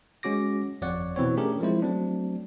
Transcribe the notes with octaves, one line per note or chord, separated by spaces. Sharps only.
G#3 C#4 F#4 D6 A#6
G1 F2 C#5 D5 F#5
B2 E3 C4 C#5
A3 C#4 D4 G4 G#4 A#4
F3 G#3 C4 E4 C5
F#3 A3 C4 D4